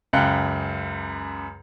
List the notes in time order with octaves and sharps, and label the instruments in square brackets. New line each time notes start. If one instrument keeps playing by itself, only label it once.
[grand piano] C#2 F#2 F5 G5 F#6 C#7